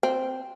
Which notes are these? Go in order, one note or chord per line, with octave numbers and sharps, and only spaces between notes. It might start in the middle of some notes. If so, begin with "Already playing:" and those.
C4